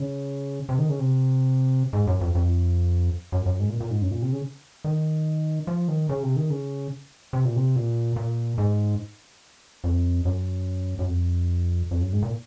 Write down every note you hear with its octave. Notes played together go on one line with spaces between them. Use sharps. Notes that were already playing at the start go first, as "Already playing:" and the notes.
Already playing: C#3
C3
D#3
C#3
C3
G#2
F#2
F2
F2
F#2
F#2
G#2
A#2
A#2
G#2
F#2
A#2
C3
C#3
D#3
F3
D#3
C#3
C3
D#3
C#3
C3
A#2
C3
A#2
A#2
G#2
F2
F#2
F#2
F2
F2
F#2
G#2
A#2